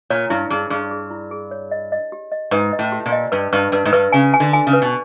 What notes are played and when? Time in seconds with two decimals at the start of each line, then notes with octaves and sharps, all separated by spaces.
0.10 A#2 C#5
0.30 G2 E4
0.50 G2 G#4
0.70 G2 G#4
0.91 G#4
1.11 E4
1.31 G#4
1.51 C#5
1.71 D#5
1.92 D#5
2.12 G4
2.32 D#5
2.51 G#2 B4
2.73 D#5
2.79 A2
2.92 G4
3.06 A#2
3.12 D#5
3.32 G2 B4
3.53 G2 B4
3.72 G2 B4
3.85 G#2
3.93 G2 B4
4.12 C#3 G#5
4.34 G#5
4.40 D3
4.53 G#5
4.67 C#3
4.73 B4
4.82 B2